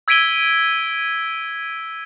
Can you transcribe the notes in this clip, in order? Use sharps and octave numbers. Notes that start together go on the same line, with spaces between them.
E6 G#6 B6 D7 D#7 G7